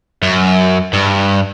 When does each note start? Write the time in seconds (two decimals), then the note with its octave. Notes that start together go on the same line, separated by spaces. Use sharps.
0.22 F#2
0.93 G2